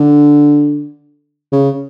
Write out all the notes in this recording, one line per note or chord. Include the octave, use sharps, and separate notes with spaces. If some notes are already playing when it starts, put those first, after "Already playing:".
Already playing: D3
C#3